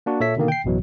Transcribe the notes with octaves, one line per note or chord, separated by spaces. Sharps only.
A#3 D4 F#4
A#2 A4 C#5 E5 B6
B2 D3 D#3 A#3
G5 C7
A1 F#2 B2 E3 F#3